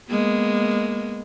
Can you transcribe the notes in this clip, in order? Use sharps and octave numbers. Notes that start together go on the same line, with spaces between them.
G#3 A#3 B3